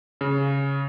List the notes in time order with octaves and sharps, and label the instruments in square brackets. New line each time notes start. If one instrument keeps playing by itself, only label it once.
[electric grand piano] C#3